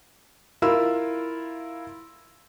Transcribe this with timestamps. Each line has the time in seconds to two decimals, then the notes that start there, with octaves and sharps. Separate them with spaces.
0.62 E4 F4 A#4 E6